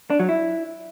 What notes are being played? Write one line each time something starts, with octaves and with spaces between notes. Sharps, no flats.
D4
F#3
E4